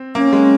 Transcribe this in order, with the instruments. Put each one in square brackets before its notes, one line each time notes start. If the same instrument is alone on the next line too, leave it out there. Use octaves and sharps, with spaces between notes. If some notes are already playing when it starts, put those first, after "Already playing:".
Already playing: [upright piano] C4
[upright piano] A#3 [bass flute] C#4
[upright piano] G#3